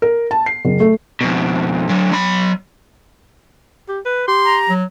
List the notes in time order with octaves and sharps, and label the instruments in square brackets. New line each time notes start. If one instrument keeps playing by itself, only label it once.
[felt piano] A#4
A5
C7
F#1
A3
[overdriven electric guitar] F2 B2
D3 F#3
F#3 B5
[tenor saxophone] G4
B4
[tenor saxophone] G4 [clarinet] C6
[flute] A#5
[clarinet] F#3